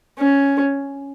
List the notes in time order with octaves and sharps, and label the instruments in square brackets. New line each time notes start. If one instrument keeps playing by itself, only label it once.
[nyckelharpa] C#4